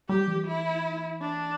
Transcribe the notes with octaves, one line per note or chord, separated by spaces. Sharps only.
G3 G4
E3
E4
D4